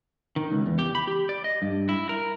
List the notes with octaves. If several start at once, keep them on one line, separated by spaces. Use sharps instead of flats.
D#3
C#2
E2
G4
B5
G4
D5
D#5
G2
E4
A#4